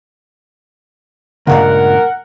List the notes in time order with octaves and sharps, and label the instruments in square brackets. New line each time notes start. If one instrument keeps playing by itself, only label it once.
[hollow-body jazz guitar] C#2 G2 A#2 [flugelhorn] A#4 [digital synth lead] F#5